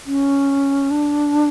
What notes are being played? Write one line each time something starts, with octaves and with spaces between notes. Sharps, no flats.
C#4
D4